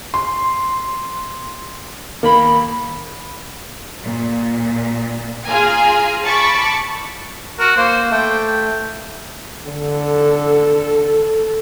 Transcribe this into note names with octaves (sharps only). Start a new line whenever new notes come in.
C6
D#2 A#3 B5
A#2
F4 G#4 G#5 A#5
A5 B5 C#6 D6
F#4 A#4
A#3 C5
A3 G5
D3 A4